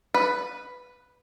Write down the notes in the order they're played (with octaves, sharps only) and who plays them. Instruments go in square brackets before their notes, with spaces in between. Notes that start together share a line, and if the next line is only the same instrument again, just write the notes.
[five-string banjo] B4